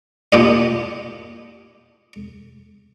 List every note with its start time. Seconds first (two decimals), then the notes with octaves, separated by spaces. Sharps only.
0.32 A#2 G4 D#5